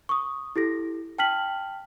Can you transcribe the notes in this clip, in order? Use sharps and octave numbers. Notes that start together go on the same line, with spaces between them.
C#6 D#6
E4 G4 A4 A#6
G5 A5 F6 B6 F#7